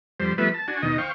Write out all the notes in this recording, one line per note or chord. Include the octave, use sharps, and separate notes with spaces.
F2 G3 C5
F3 G3 A3 B3 B4 E5
A5
D4 F#4 G#5
D#2 B2 D#3 D#5
C5 F5 G5 C#6